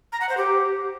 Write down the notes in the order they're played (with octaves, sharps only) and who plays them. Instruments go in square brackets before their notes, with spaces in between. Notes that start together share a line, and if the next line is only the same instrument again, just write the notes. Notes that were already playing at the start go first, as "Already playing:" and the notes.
[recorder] A#5
F#5
C5
G4